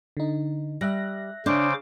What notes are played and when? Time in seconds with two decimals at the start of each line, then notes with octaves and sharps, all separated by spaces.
0.17 D3 D#4
0.81 G3 E5 F#6 A#6
1.46 C#3 D4 C5 D6